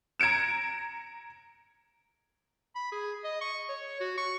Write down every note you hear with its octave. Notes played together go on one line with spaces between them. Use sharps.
A#5 G#6 C#7 D7 E7
B5
G#4
D#5
C#6
C#5
F#4
C#6